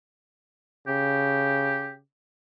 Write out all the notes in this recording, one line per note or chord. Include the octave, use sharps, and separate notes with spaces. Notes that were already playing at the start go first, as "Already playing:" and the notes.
C#3 G4